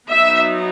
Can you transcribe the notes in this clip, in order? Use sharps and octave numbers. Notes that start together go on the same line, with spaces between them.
F#3 B3 D#4 E5